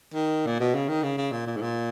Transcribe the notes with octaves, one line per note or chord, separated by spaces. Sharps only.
D#3
A#2
B2
C#3
D#3
C#3
C#3
A#2
A#2
G#2
A#2